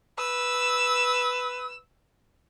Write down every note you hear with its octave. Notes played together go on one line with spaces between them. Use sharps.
B4 E6